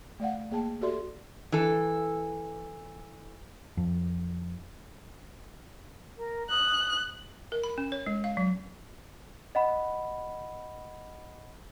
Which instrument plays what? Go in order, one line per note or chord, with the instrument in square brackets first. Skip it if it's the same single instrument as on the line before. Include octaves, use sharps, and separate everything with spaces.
[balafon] A3 D5 F5 F#5
A#3 G#4 G5 A5
F#4 G4 A4 D5 E5 C6
[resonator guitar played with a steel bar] E3 A4
[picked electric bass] F2
[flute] A#4
[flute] D#6 [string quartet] F#6
[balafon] A#4
B5
C#4
C#5
G#3
F5
F#3
[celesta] D#5 F#5 B5